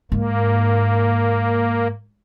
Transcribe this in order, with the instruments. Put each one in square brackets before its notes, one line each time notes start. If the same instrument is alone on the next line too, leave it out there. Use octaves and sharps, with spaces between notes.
[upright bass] G#2 [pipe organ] A#3